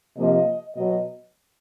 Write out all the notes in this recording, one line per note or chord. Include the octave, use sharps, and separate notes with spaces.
C3 F3 A#3 D#5
B2 F#3 B3 D#5